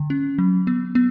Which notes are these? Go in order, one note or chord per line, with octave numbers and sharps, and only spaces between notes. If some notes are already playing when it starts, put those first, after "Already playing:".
Already playing: D3
C#4
F#3
B3
B3